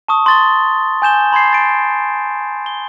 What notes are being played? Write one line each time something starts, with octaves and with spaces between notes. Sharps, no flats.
A5 C#6 D#6
C6 A6 G7
G#5 G6 E7 G7
B5 C6 G#6 C7
A6 D7
G7